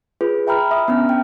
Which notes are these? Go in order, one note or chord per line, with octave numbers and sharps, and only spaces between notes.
F4 G#4 B4
E5 G5 A#5 B5 F6
E5 D#6
B3 C#4 D4 F6
G5